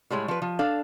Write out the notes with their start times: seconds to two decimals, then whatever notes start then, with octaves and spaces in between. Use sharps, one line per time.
0.10 A2 G3 G#3 C#5
0.28 F3 B4
0.42 F3
0.59 D4 A4 F5